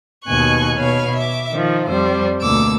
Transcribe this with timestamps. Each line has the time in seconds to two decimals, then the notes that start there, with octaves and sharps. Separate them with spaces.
0.25 D#2 B2 G#5 C#6 F#6
0.77 B2 C#5 F5 B5
1.16 E5 D6
1.52 D#3 F3
1.89 F2 G3 C5
2.42 D2 B2 A#3 D6 E6